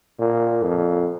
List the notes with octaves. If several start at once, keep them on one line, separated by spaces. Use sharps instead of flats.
A#2
F2